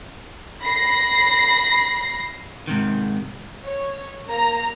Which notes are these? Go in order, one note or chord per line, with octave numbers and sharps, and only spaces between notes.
B5 A#6 C7
G#2 C3 D#3
C#5
A#3 A#5